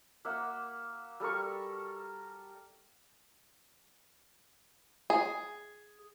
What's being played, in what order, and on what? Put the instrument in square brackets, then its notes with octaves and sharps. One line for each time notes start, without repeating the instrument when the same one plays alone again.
[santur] A#3 E5 F#5
G3 A4 A#4 C#6
[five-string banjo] G#4